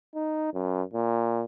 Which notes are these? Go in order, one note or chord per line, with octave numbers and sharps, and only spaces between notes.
D#4
F#2
A#2